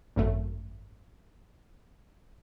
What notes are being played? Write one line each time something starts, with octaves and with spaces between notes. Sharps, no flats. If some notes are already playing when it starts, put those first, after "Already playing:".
G#1 F#2 A3